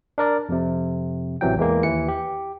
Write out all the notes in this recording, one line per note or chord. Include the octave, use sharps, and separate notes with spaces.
D4 A#4 D5
F2 C3
A1 C3 E3 F#3 G5
E2 E3 G#3 A#3
D#2 E3 C#7
G4